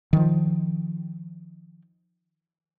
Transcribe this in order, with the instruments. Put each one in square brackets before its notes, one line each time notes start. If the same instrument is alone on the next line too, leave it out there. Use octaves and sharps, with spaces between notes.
[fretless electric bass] D#3 F3